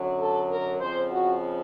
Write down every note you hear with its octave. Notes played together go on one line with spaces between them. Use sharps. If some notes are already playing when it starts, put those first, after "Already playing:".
Already playing: F#2 D3 F#3
A4
A#4
F2 C#3 F3 C5
F#4